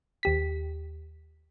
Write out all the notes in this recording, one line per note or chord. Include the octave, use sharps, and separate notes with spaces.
D#2 G4 B6